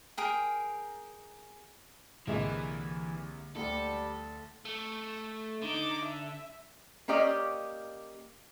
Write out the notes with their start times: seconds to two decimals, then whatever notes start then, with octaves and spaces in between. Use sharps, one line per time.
0.17 G#4 A#4 G5
2.27 C2 D3 E3 G#3 A#3 G4 E5
3.56 D2 G3 A4
4.65 A3
5.62 D3 D#4 D6
6.05 E5
7.08 A#3 C#4 G4 D5 D#5